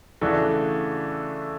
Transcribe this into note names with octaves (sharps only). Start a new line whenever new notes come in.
C#3 E3 A3 D4 F#4